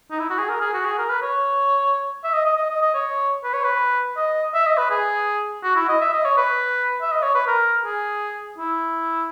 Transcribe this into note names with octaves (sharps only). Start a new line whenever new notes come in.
D#4
E4
F#4
G#4
A#4
G#4
F#4
G#4
A#4
B4
C#5
E5
D#5
D#5
D#5
D#5
D#5
C#5
B4
C#5
B4
D#5
E5
D#5
B4
G#4
F#4
E4
D#5
E5
D#5
C#5
B4
E5
D#5
C#5
B4
A#4
G#4
E4